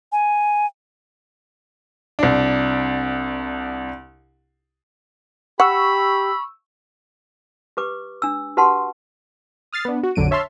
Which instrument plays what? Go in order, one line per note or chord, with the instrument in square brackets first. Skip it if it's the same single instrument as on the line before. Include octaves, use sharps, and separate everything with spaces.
[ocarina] G#5
[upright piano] C2 D4
[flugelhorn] G4 [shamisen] F#5 [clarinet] B5 [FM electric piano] C#6 E6
[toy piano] G4 B4 D6
D4 E6
F#4 G4 B4 F#5 A5 C6
[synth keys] D#6 F6 A6 C7
B3 D4
F#4
A#1 F2 D3 F#3 D7 D#7
C#5 E5 A5 C6 F6